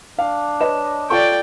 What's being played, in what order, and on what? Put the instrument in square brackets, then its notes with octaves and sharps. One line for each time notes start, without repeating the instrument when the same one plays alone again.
[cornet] D4 [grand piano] F5
[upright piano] B4 [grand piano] C#5 D#5 E7
[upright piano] F4 A4 C#6 [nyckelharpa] D5 G5